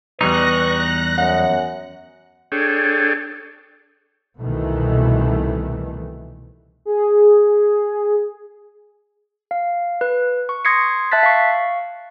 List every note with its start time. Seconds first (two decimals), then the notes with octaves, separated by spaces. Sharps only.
0.21 E2 G3 D#4 B4 C#6 F#6 A#6
1.18 F#2 F#5
2.52 D4 G#4 A4 C#5 G5
4.40 C2 B2 D#3 E3 A3
6.85 G#4
9.51 F5
10.01 B4
10.49 C#6
10.65 C6 D#6 G#6 A#6 C7 C#7
11.12 E5 A5 F#6 A6 B6
11.23 F5 C#6